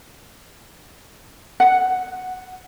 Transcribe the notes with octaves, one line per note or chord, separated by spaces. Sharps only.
F#5